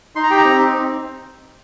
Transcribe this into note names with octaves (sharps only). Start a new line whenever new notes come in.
D#4 C6
A#5
G4 G5
A#5
C4
D#4
C4